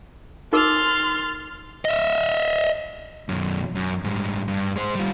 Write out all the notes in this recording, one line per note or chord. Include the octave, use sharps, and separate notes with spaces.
D#4 A#4 C6 D6 F6 A6
D#5 E5
F#2 B2
F#2
G#2 G3
G2
G#3 C5
G3 F4